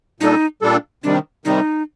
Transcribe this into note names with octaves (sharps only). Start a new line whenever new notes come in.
A#2 G3 D4 D#4 A4
A#2 G3 D4 A4
C3 D#3 G3 D4
C3 D#3 G3 D#4